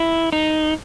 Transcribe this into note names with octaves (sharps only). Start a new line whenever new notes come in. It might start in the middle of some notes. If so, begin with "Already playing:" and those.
Already playing: E4
D#4